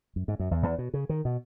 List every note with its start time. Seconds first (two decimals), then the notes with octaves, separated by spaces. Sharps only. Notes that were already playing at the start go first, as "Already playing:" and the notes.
0.16 F#2
0.28 G#2
0.39 F#2
0.51 E2
0.63 E2
0.78 B2
0.94 C#3
1.09 D#3
1.25 B2